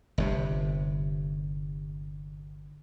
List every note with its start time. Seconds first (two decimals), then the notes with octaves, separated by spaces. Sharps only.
0.18 G1 G2 C3